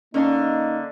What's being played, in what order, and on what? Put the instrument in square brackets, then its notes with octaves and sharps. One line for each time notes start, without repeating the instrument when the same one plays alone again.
[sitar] D3 [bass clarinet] A#3 [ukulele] C#4 D#5 A5 [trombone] D#4